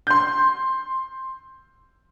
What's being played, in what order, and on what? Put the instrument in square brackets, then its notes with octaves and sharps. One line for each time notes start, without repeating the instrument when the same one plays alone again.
[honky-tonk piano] C6 G6